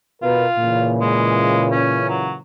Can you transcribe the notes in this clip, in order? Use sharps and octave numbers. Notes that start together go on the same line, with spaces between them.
B2 F4 A#4 B4
A#2 C#3 E3
G#3
C#4
F#3